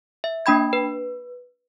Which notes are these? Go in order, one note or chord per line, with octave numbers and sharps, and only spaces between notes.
E5
A#3 D4 G5 B5 G#6
B4